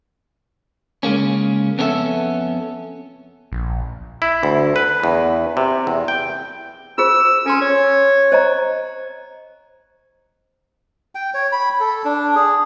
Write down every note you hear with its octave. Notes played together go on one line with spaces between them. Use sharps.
C#3 G#3 A#3 C#4
F2 B3 C#4 D4 A4 E5
A#1
E4
D2
B4
E2
C3
E2
G5
F4 G#4 C5 E6
C#4 A4 C6
C#5
C5 D#5 A#5
G5
C#5
B5
A4
D4
G#4